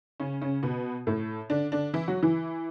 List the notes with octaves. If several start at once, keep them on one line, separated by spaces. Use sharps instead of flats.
C#3 C#4
C#3 C#4
B2 B3
A2 A3
D3 D4
D3 D4
E3 E4
F#3 F#4
E3 E4